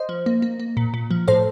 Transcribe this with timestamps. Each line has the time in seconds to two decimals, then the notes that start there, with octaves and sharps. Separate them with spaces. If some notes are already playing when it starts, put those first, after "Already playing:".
Already playing: C5 D#5
0.09 F3
0.26 A#3
0.42 A#3
0.59 A#3
0.77 A#2
0.94 A#2
1.11 F3
1.28 A2 A4 C5